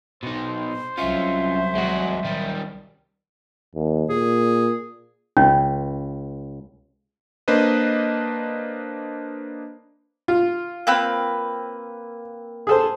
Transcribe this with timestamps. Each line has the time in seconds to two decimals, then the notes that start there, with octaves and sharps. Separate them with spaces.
0.23 B2 D#4 C5
0.98 C2 F#3 C#4 F4 E5
1.75 G#3 F#4
2.25 D#3 G3
3.75 D#2
4.10 A#2 G#4
5.37 C#2 C#4
7.48 A#3 D4 B4 C5 D#5
10.28 F4
10.87 A#3 C4 B4
12.67 G#4 A4 C5